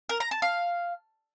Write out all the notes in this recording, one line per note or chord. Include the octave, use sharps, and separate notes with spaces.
A#4
A#5
A5
F5